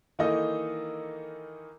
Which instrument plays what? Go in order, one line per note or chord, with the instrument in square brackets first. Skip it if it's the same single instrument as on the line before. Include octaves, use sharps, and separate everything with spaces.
[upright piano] D#3 E3 A#3 D#4 A4 D#5